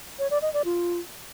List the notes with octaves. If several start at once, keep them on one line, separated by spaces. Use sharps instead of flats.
C#5
D5
D#5
D5
F4